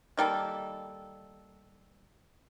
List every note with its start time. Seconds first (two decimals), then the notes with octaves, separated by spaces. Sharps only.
0.17 D#3 G3 A#3 A4